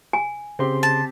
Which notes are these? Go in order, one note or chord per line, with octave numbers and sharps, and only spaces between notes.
G#5
C#3 C4 G4 C6
A5